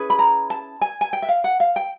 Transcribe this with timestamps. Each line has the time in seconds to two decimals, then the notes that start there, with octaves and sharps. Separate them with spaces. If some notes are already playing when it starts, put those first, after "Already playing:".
Already playing: C#4 E4 G#4 B4
0.10 B5
0.19 A#5
0.50 A5
0.81 G#5
1.01 G#5
1.13 G5
1.22 E5
1.29 F5
1.44 F#5
1.60 F5
1.76 G5